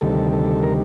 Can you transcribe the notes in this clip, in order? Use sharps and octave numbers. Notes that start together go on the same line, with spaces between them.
D2 C3 D#3 G3 A4
A4
A#4